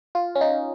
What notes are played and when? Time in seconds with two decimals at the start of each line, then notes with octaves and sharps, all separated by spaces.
0.15 F4
0.35 C#4
0.41 D#4